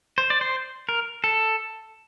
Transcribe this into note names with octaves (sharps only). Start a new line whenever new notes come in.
C5
D5
C5
A#4
A4